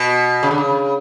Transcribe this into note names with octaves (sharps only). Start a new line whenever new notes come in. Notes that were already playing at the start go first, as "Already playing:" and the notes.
Already playing: B2
C#3
D3
C#3